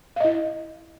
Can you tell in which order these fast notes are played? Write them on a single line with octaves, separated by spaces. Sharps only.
F5 D#5 E4